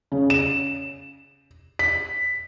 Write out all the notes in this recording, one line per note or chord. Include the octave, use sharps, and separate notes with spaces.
C#3
E7
B6